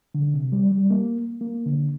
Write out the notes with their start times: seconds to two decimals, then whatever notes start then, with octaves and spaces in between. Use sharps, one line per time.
0.15 D3
0.34 C3
0.52 G3
0.71 G3
0.90 A#3
1.41 A#3
1.66 D3